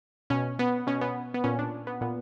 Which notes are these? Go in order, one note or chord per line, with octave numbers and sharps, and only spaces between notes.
B2 C#4
B3
B2 C#4
B3
B3
A#2 C#4
D4
B3
A#2 B3